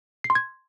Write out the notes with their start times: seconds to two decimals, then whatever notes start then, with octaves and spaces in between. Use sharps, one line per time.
0.24 C7
0.30 C6
0.35 G#6